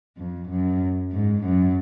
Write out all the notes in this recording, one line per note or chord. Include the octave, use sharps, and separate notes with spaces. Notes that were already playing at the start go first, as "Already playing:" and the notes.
F2
F#2
G#2
F#2